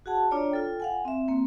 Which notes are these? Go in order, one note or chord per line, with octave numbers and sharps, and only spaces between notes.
F#4 G#4 F#5 A5
D4 F4 C#5 D5 A#5
F4 A4 G5
F5 F#5 G#5
C4 E5
A#3 C4